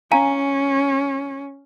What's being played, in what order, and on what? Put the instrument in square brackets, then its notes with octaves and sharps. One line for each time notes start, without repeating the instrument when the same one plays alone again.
[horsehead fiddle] C#4 [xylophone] F5 G#5 A#5